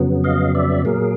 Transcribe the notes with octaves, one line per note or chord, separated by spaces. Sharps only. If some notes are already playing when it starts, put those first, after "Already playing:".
Already playing: F2 C#3 F#3 B3
D#5 F5
D5 E5
A#2 F#3 A#3 G#4 A#4